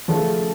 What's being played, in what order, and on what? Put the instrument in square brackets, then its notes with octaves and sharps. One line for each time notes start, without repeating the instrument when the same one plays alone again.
[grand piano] C#3 F3 A3 C#4 F4